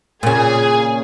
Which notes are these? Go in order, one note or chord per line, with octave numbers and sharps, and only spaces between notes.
A#2 C#3 G#4 G#5